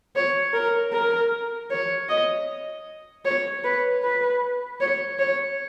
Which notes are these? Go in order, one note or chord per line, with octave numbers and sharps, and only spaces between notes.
C#5
A#4
A#4
C#5
D#5
C#5
B4
B4
C#5
C#5